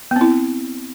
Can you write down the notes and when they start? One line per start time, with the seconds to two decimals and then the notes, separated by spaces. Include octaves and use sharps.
0.11 B3
0.16 C4
0.21 E4